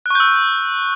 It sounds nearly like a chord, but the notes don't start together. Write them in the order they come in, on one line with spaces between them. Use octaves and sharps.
F#6 C#6 G6 E6